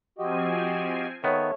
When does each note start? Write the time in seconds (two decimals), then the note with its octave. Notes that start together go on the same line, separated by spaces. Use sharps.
0.18 F3 C4 F#4 G4 D#5 G#5
1.24 D#3 B3 A4 C#5 E5